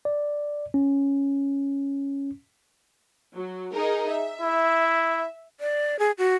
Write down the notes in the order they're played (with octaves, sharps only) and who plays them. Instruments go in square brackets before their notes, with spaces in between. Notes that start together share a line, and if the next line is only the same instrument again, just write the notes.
[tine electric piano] D5
C#4
[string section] F#3
D#4 G#4 A#4
E5
[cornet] E4
[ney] D5
G#4
F#4